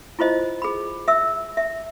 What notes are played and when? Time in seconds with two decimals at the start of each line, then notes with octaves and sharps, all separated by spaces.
0.19 E4 F4 C5 D#5
0.62 G#4 B5
1.08 E5 E6
1.57 E5